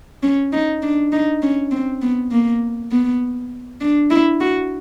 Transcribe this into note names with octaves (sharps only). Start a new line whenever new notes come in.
C#4
D#4
D4
D#4
C#4
C4
B3
A#3
B3
D4
E4
F#4